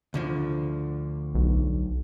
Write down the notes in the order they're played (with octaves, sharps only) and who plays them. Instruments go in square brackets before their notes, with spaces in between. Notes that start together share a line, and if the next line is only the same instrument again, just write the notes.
[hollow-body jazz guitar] D2 D3 F3
[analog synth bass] B1